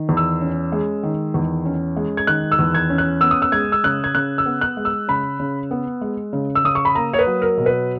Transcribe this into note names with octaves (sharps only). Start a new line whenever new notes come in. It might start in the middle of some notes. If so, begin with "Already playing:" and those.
Already playing: D#3
E2
E6
C#4
G#3
D#3
E2
C#4
G#3
G#6
D#3 F#6
E6
E2
G#6
C#4
F#6
B3 E6
D#6
E6
G#3 G#6
E6
C#3 F#6
G#6
C#3 F#6
E6
B3
F#6
G#3
E6
C#3 B5
C#3
B3
G#3
C#3
E6
C#3 D#6
C#6
B5
A#3 A#5
C#5
B4
F#3
A#4
B2
B4